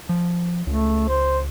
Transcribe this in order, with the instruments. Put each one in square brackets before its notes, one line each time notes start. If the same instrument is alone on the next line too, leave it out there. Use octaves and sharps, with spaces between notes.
[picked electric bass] F3
[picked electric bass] C#2 [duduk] A3
[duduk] C5